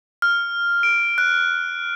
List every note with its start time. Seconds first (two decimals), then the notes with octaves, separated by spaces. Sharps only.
0.22 F6
0.83 D7
1.18 F#6